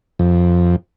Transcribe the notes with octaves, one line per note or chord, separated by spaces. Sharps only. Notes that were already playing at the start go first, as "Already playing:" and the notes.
F2